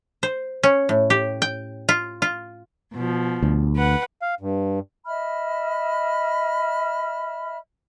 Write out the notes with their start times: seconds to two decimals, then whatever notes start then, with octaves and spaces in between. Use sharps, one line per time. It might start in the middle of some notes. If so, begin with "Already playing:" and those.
0.23 C5
0.63 C#4
0.89 A2
1.10 G4
1.42 G5
1.89 F4
2.22 F4
2.92 B2 F3
3.42 D2
3.75 B4 F#5
4.22 F5
4.41 G2
5.07 D#5 E5 B5 F6